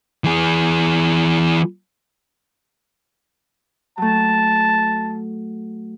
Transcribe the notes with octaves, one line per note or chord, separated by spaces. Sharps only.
E3 G#4
F#3 A3 A5